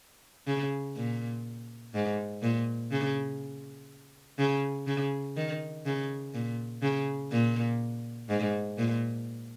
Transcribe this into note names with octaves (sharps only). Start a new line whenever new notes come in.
C#3
A#2
G#2
A#2
C#3
C#3
C#3
D#3
C#3
A#2
C#3
A#2
G#2
A#2